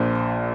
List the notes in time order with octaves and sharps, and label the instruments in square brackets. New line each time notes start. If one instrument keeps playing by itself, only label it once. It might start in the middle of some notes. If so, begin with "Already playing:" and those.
Already playing: [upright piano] A#1 A#2 C5